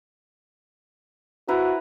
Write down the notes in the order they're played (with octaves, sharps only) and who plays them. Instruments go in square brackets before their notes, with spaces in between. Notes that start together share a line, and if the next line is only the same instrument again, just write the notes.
[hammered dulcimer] E4 B4 A#5 [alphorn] F#4